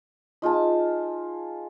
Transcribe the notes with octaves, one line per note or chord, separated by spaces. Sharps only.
D#4 F4 G#4 A5